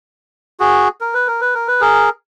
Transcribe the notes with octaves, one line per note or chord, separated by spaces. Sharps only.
F#4 G#4
A#4
B4
A#4
B4
A#4
B4
G#4 A#4